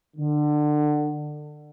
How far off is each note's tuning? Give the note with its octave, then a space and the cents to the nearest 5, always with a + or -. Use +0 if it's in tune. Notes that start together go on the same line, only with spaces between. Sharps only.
D3 +25